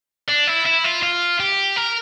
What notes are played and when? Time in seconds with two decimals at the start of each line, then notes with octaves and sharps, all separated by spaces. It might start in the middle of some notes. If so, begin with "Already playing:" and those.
0.28 D4
0.47 E4
0.66 E4
0.84 F4
1.03 F4
1.40 G4
1.76 A#4